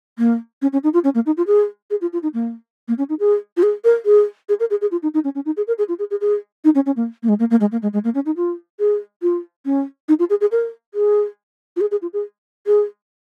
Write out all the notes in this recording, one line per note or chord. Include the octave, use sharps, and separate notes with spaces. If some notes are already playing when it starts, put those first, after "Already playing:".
A#3
C#4
C#4
D#4
F4
C#4
A#3
D#4
F4
G#4
G#4
F4
F4
D#4
A#3
A#3
C#4
D#4
G#4
F4
G#4
A#4
G#4
G#4
A#4
G#4
G#4
F4
D#4
D#4
C#4
C#4
D#4
G#4
A#4
G#4
F4
G#4
G#4
G#4
D#4
C#4
C#4
A#3
A#3
G#3
A#3
A#3
G#3
A#3
G#3
G#3
A#3
C#4
D#4
F4
G#4
F4
C#4
D#4
F4
G#4
G#4
A#4
G#4
F4
G#4
G#4
F4
G#4
G#4